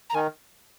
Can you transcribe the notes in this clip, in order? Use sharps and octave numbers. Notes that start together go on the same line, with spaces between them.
A#5
D#3 G#5